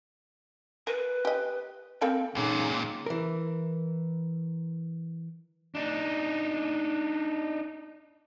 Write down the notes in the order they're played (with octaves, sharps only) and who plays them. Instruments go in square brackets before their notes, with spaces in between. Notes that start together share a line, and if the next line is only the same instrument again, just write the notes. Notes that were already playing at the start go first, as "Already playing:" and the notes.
[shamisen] A#4 [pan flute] B4
[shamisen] G4 D#5
[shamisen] A#3 A4 G5 [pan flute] C4
[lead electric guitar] C#2 A#2 [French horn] C#3 [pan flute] D#4
[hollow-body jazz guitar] E3 A#4
[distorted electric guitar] D4 D#4